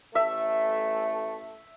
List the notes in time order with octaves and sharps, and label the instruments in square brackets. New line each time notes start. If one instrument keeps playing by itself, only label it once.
[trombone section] A1 A3 [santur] E5